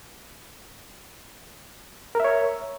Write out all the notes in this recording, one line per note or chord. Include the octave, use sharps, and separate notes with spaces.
A#4 C#5 E5